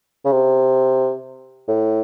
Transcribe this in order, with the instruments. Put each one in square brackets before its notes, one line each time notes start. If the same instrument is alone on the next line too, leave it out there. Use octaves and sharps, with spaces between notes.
[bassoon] C#3
C3
A2